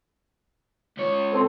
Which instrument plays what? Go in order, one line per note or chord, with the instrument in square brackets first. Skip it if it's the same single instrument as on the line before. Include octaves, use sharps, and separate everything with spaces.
[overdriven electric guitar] C#2 C#5
[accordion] C4 A4 C5